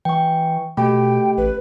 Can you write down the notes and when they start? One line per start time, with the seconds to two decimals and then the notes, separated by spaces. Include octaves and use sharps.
0.05 E3 G5 C#6
0.77 B2 A3 G4 G5
1.37 A1 B4